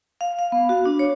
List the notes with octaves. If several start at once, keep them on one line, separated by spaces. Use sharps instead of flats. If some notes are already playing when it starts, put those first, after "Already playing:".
F5
F5
B3
F#4
D4
C#5